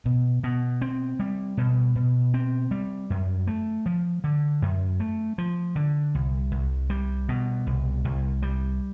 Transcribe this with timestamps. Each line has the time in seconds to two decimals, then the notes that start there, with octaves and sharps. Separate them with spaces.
0.06 B2
0.43 B2
0.82 C4
1.19 G3
1.57 B2
1.96 B2
2.34 C4
2.71 G3
3.10 F#2
3.47 A3
3.86 F3
4.24 D3
4.62 F#2
5.00 A3
5.38 F3
5.76 D3
6.15 C2
6.52 C2
6.90 G3
7.29 B2
7.67 C2
8.05 C2
8.42 G3